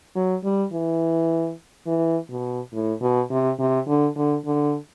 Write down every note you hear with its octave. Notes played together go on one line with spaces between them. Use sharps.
F#3
G3
E3
E3
B2
A2
B2
C3
C3
D3
D3
D3